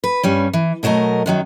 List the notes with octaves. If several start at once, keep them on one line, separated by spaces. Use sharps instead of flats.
B4
G2 G3 C#4
E3
B2 F#3 A3 A#4 D#5
F#2 D#3 F#3